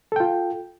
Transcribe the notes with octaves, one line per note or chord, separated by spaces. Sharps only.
F4 A4 G5